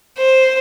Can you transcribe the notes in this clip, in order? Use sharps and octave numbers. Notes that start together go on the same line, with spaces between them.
C5